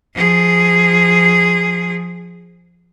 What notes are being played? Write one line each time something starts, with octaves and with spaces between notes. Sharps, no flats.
F3 G#4